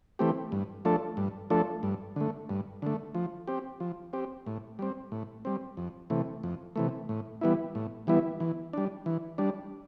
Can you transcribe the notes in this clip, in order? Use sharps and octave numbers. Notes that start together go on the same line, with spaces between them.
E3 A3 C4 G4
G2
F3 A3 D4 A4
G2
F3 A3 D4 A4
G2
D3 A3
G2
D3 A3
F3
C4 G4
F3
C4 G4
A2
G3 C4
A2
G3 C4
F2
C3 E3 A3
F2
C3 E3 A3
A2
E3 G3 B3 E4
A2
E3 G3 B3 E4
E3
G3 D4
E3
G3 D4